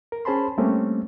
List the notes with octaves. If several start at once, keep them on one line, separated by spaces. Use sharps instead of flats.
A#4
C#4 G#4 C5 A5 B5 C6
G3 A3 A#3 C4 C#4